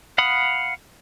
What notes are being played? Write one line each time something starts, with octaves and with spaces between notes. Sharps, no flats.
F5 F#5 B5 D#6